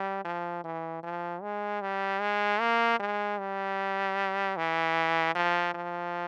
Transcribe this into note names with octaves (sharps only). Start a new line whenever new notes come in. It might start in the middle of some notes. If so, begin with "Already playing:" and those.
Already playing: G3
F3
E3
F3
G#3
G3
G#3
A#3
G#3
G3
E3
F3
F3